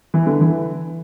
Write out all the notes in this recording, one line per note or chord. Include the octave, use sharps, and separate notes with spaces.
E3
D3
E3